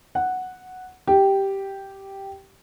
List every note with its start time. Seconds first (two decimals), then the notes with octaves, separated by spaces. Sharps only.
0.15 F#5
1.07 G4